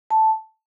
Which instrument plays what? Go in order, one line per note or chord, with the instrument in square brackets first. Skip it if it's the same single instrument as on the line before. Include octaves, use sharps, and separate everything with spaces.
[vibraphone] A5